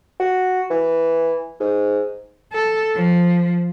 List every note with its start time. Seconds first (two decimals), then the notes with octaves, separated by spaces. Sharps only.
0.20 F#4
0.71 E3
1.60 G#2
2.53 A4
2.96 F3